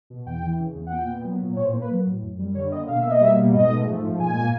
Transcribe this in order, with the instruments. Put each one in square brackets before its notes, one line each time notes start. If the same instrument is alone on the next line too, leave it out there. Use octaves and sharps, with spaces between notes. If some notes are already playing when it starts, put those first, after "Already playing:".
[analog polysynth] B2
E2 G5
E3
C#3
E2
F#5
A#2 G5
B3
F#3
A#2
A2 C#5
C5
A#3
B4
F#3
A2
F#2
G3
D3 C#5
A#3 D#5
B2 F5
A#3 E5
D#5
G3 E5
B2
G#2 D#5
A3
F3
G#2
A#2 G#5
A#3